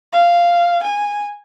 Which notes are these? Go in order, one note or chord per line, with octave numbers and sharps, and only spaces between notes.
F5
G#5